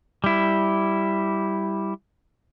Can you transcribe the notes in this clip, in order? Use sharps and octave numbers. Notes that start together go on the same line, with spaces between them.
G3 E4